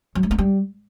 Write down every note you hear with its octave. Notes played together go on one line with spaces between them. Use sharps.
F#3
A3
A#3
G3